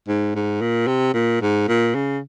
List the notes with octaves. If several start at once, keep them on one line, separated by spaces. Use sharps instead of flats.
G#2
G#2
A#2
C3
A#2
G#2
A#2
C#3